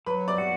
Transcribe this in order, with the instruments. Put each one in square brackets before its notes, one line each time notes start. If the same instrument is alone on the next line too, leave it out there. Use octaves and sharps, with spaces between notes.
[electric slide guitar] F#3 [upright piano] B4 B5
[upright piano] D5 D6
[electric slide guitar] F#4